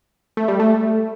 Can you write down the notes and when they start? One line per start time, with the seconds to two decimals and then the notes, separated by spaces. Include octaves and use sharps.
0.37 A3
0.48 G3
0.60 A3